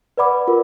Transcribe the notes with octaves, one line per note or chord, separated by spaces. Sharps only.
B4 D5 F#5 B5 D6
F4 A#4